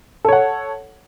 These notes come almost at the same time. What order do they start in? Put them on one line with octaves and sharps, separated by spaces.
A4 C#5 F#5